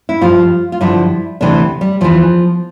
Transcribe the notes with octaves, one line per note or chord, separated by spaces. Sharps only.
E4
G2 F3 F4
F4
G2 D3 F3 E4
D2 C3 E3 D4
G3
E2 E3 F3